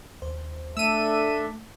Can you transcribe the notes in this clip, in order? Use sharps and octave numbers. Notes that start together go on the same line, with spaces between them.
D#2 C5
A3 D4 A4 E5 E6 D#7